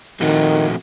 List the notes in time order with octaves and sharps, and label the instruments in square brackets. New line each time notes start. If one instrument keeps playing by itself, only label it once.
[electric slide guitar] A#2 F3 A3 C4 F#4 [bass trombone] D#3